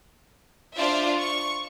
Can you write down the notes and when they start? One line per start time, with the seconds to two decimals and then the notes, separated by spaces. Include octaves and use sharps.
0.76 D4 F4 C5 D5 E5
1.18 C#6